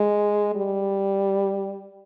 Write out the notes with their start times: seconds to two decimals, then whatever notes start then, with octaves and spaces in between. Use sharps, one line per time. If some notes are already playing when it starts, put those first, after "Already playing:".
Already playing: G#3
0.56 G3